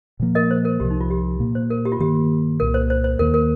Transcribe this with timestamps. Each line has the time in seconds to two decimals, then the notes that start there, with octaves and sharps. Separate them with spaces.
0.20 A#2 F3 A#3
0.35 A#4 D#5
0.51 C5
0.65 A#4
0.80 C2 C3 F3 G4
0.91 D#4
1.01 F4
1.10 G4
1.40 A#2 A#3
1.55 C5
1.70 A#4
1.85 G4
1.92 F4
2.00 G2 D#3 A#3 G4
2.60 C2 A#2 A#3 A#4
2.74 C5
2.90 C5
3.04 C5
3.19 D#2 D#3 A#3 A#4
3.34 A#4